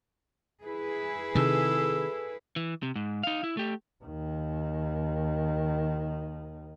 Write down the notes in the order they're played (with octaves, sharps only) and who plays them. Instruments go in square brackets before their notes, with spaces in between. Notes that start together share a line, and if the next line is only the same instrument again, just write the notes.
[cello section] E4 G#4 B4
[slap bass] C3 D#3 [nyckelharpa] A4
[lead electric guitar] E3
C3
G#2
D#4 F5
E4
A3 G4
[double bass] D#2 D#3